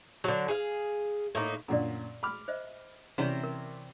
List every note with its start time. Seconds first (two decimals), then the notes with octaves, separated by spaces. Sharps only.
0.24 D3 F#3
0.48 G#4 F5
1.35 A2 A#3 D#4
1.68 F#2 A#2 D3 D5 A#5
2.23 B5 D6 F6
2.48 C5 D#5 E5
3.18 C3 E3 C#4 C5 D5 G5
3.43 A#4